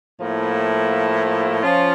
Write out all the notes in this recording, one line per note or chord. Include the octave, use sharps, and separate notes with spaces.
A2 F3 A#3 E4
F3 C#4 F4